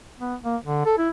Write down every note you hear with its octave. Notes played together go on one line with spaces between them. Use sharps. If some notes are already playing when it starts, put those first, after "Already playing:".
B3
A#3
D3
A4
E4